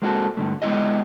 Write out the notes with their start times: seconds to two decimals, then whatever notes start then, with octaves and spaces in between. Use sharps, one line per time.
0.02 G#3 A#3 C4 E4 F#4 A4
0.37 G2 D3 A3
0.62 G#3 B3 E4 G4 D#5